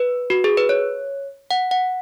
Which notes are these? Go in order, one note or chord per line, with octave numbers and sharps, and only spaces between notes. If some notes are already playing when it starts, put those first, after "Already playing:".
Already playing: B4
F#4
G#4
B4
C#5
F#5
F#5